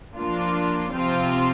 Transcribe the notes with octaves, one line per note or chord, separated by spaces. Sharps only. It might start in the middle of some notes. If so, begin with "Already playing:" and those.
F3 A#3 D4 F4
C3 F3 C4 F4